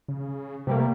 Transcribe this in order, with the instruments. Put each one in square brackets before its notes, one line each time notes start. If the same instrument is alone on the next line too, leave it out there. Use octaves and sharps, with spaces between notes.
[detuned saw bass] C#3
[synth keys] C3 G3 A#3 [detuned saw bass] A3